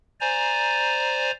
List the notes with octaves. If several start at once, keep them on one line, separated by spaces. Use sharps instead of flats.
C5 D5 G#5 A#5